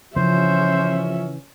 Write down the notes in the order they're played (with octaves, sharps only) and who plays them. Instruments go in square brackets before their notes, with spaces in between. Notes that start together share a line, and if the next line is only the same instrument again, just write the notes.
[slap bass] C#3 E3 [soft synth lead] F3 [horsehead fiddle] C#4 E5 [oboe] C5